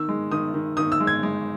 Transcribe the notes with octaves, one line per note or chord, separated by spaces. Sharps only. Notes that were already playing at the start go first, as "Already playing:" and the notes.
Already playing: D#3 E6
G#3
D#3 D#6
D#3
D#3 D#6
E6
G#3
G#6
G#3